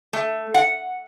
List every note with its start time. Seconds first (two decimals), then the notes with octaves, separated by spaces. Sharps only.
0.13 A3
0.54 F#5